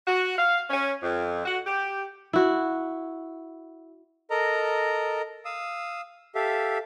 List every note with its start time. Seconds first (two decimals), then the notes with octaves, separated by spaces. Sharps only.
0.07 F#4
0.38 F5
0.70 C#4
1.03 F2
1.45 F#4
1.67 G4
2.33 E4 F#4
4.30 A4 A#4 D#5 A#5
5.45 F5 D#6 E6
6.35 G4 A4 E5 F5